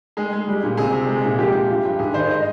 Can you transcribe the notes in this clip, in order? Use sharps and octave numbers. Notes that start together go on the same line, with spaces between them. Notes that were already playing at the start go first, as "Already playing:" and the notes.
G#3 G#4
G#3
G3
A#2
C3 G#4
C3
G#3
A#2
F3 G4
A#2
G2
G2
G#2 G#4
D#3 C5
D#5